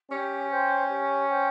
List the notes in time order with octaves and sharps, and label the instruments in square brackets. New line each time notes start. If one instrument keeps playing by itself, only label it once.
[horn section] C#4 [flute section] G4
[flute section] C5 G5
G4
C5 G5